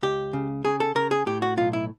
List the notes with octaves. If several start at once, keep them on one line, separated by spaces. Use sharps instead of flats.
C#2 G4
C#3
C#3 G#4
A4
C#3 A#4
G#4
A2 G4
F#4
B1 F4
E4